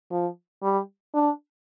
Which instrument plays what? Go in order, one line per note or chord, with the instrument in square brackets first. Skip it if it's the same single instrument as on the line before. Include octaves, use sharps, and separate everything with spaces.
[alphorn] F3
G3
D4